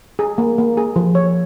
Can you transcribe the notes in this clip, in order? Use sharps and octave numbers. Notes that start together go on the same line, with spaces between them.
G#4
A#3
A#3
G#4
F3
C#5